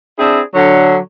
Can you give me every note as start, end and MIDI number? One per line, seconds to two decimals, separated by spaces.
0.19 0.41 60
0.19 0.41 62
0.19 0.41 64
0.19 0.41 68
0.54 0.97 50
0.54 0.97 54